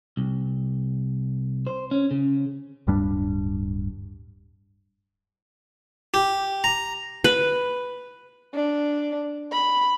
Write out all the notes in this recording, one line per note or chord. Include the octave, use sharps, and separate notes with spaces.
C2
C5
C#4
C#3
D1 G2 G3 D4
G4
A#5
B4
D4
B5